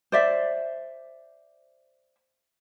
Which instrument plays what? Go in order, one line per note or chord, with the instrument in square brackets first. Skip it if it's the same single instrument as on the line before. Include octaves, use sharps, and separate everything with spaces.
[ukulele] C5 D5 E5